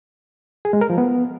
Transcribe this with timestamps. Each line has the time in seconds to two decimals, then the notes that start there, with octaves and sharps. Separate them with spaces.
0.65 G#4
0.73 G#3
0.81 A#4
0.90 F3
0.98 B3